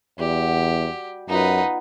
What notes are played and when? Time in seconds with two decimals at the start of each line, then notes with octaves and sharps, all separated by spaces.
0.19 E2 G3 F#4 G4
1.29 F#2 B3 D#4 F4 B4